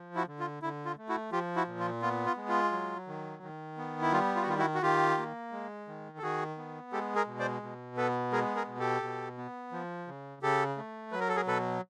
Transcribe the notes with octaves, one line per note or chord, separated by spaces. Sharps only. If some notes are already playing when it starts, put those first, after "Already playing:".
Already playing: F3
E4 F#4
D3
F4
D3 E4
F4
A3
E4 F#4
F3 F4 G4
E4 F#4
A#2
F4
B3 F4
F4
G#3
F4
F#3
D#3
D#3
B3
E4
G3 F4
F4
F#4
D#3 F4
E4 F#4
F#4
D#3 F4 G4
A#3
G#3
D#3
A4
D#3 F#4 G#4
B3
G#3 G4 A4
G#4 A#4
B2
C5 D5
B2
B3 A4 B4
G#3 G#4 A#4
G#4 A#4
B2
G4 A4
B2
B3
F3
C#3
C#3 G4 A4
A3
F#3 B4
A#4
A4
G#4 A#4
B2 A4 B4